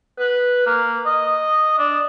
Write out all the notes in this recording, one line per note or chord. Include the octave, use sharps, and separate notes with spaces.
B4
A#3
D#5
D4